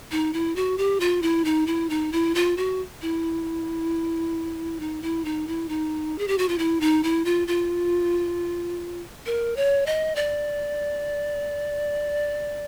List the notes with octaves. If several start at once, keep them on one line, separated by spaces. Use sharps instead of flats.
D#4
E4
F#4
G4
F4
E4
D#4
E4
D#4
E4
F4
F#4
E4
D#4
E4
D#4
E4
D#4
G#4
G4
F#4
F4
E4
D#4
E4
F4
F4
A#4
C#5
D#5
D5